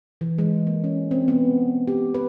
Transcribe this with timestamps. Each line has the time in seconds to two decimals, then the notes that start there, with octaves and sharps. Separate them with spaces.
0.21 E3
0.38 G#3
0.67 A#3
0.84 C#4
1.11 C4
1.28 B3
1.87 G4
2.14 B4